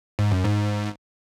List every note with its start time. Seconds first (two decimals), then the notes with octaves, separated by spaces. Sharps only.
0.19 G#2
0.32 F#2
0.45 G#2